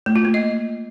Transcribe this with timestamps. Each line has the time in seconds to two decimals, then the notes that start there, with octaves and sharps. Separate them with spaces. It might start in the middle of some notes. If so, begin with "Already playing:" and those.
0.06 A3
0.16 F4
0.25 A#3
0.34 D#5